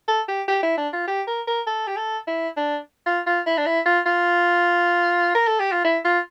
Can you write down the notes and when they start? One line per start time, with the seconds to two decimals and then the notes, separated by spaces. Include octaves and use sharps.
0.08 A4
0.28 G4
0.48 G4
0.63 E4
0.77 D4
0.93 F4
1.08 G4
1.27 A#4
1.47 A#4
1.67 A4
1.87 G4
1.97 A4
2.27 E4
2.57 D4
3.06 F4
3.27 F4
3.46 E4
3.58 D4
3.66 E4
3.86 F4
4.06 F4
5.35 A#4
5.47 A4
5.60 G4
5.72 F4
5.85 E4
6.05 F4